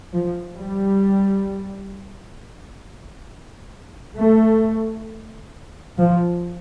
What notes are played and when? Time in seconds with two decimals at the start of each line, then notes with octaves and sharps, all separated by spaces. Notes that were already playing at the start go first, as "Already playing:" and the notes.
0.12 F3
0.58 G3
4.17 A3
5.98 F3